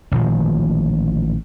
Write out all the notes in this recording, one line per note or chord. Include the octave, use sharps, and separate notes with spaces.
A1 A#2 D#3 F3